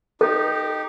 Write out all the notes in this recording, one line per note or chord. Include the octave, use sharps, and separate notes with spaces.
D#4 G4 A4